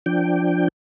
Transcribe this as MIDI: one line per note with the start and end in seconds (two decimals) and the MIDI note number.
0.06 0.68 53
0.06 0.68 62
0.06 0.68 79